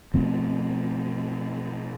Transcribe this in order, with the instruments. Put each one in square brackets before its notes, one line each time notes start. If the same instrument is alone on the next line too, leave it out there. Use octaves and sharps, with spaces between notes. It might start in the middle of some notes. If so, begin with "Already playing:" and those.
[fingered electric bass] B2 F3 A3 C4